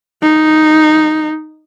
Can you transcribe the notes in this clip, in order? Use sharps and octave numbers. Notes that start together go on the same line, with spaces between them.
D#4